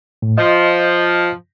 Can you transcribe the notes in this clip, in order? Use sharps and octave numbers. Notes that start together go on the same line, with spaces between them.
A2
F3 D#5